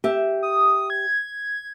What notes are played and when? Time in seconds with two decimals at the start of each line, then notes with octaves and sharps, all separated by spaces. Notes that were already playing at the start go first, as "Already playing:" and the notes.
0.04 G4 E5
0.43 D#6
0.90 G#6